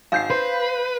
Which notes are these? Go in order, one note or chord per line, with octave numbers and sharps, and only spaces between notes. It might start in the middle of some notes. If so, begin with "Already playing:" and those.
G#1 F5 G6 C7
B4 C5